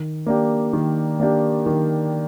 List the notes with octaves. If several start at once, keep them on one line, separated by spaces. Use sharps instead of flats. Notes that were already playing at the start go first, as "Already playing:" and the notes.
Already playing: D#3
A#3 D4 G4
D#3
A#3 D4 G4
D#3